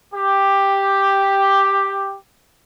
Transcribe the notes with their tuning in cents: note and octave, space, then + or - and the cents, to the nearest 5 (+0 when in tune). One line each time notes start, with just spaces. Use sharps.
G4 +5